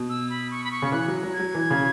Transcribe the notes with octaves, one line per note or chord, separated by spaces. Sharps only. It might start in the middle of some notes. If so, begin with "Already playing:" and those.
Already playing: B2
E6
B5
C#6
B5
C#6
C#3
E3 F#6
F#3
F#3
G#6
F#3
E3
C#3